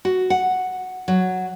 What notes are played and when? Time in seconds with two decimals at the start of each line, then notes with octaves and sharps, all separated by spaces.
0.05 F#4
0.30 F#5
1.08 F#3